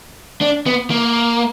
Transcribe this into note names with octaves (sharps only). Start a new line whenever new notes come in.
D4
B3
A#3